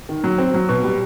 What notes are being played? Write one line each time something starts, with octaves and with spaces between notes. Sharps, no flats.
D#3
F#3
C4
F#3
B2
G3